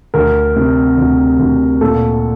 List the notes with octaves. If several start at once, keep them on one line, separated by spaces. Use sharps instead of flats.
D2 A#4
C3
D2
D2
A#2 A4